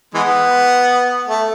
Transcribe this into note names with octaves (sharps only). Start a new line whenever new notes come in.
E3 G#3 B3
A3